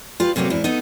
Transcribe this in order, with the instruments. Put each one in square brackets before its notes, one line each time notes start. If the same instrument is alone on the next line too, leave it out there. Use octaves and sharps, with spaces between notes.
[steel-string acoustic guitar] F4 G4 B4
A2 C3 F#3 A#3 B3
E2 G#2 E4
A3 B3 D#4